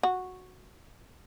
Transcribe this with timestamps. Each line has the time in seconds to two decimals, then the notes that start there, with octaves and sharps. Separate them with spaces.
0.03 F#4